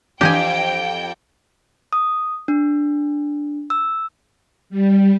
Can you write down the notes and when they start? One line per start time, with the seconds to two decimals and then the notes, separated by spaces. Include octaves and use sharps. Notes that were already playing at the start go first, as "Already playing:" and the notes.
0.21 F2 E3 D4 G4 D#5 G5 G#5
1.93 D#6
2.48 D4
3.70 E6
4.70 G3